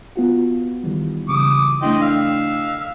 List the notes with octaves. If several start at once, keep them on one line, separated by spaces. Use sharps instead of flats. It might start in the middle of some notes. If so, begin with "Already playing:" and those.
B3 F4 F#4
D#3 E3 G3
C#3 E3 G3 D6 D#6
A3 D4 E4 D#5 G5 C6
F5 E6